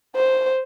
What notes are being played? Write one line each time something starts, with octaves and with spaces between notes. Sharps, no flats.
C5